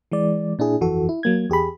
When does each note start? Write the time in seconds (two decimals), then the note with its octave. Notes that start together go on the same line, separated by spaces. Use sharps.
0.12 E3 G#3 D5
0.59 A#2 D4 E4 G#4
0.81 G1 F2 E3 F#4 A4
1.09 E4
1.23 F#3 A#3 G#6
1.50 E2 G4 G#4 B5